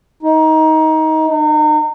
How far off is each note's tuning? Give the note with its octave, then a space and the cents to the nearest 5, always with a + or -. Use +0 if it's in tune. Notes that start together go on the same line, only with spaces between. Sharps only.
D#4 +20
D#4 -35